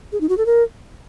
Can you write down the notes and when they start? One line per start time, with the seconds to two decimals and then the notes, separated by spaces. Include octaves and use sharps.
0.12 G#4
0.21 D#4
0.29 F#4
0.38 A4
0.46 A#4